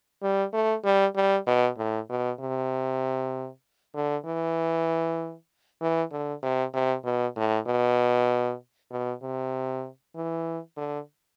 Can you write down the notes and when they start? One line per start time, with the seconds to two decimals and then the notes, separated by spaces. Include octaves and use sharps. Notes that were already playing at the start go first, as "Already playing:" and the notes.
0.23 G3
0.53 A3
0.84 G3
1.16 G3
1.47 B2
1.78 A2
2.09 B2
2.40 C3
3.95 D3
4.26 E3
5.81 E3
6.12 D3
6.43 C3
6.74 C3
7.05 B2
7.36 A2
7.67 B2
8.91 B2
9.22 C3
10.15 E3
10.77 D3